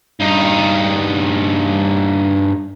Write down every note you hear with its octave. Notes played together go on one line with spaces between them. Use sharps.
G2 D#4